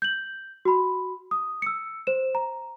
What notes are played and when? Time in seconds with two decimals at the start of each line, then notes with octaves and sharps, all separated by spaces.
0.02 G6 F#7
0.65 F#4 B5
1.31 D#6
1.62 E6 C#7
2.07 C5 E7
2.35 A#5